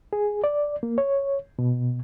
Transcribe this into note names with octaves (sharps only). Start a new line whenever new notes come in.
G#4
D5
A#3
C#5
B2